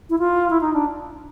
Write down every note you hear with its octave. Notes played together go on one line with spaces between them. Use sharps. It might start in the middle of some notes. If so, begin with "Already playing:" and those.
E4
F4
E4
D#4
D4